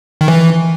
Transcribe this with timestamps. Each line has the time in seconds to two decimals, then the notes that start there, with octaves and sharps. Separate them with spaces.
0.21 D#3
0.28 E3